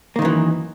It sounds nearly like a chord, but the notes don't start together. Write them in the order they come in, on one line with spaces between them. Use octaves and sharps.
A#3 D#3 F#2 E3